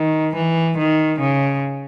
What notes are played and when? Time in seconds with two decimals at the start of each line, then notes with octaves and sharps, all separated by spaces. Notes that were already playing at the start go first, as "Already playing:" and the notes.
Already playing: D#3
0.35 E3
0.78 D#3
1.20 C#3